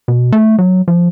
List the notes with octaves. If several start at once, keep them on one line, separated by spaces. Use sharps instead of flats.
B2
A3
F#3
F3